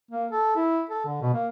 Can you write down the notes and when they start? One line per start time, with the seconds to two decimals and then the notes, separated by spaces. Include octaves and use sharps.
0.11 A#3
0.31 A4
0.56 E4
0.90 A4
1.05 D3
1.22 B2
1.34 A#3